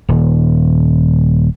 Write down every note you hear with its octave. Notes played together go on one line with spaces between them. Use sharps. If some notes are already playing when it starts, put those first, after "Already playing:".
D#1